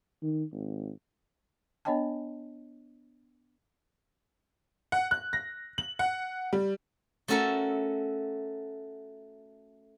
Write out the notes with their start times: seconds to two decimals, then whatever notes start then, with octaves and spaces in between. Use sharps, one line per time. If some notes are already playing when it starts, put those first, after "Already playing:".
0.22 D#3
0.52 G#1
1.85 B3 D4 C#5 D#5 G5 A5
4.92 F#5
5.11 F#6
5.33 A#6
5.78 F#7
5.99 F#5
6.53 G3
7.28 A3 C#4 F#4 A4 A#4 E5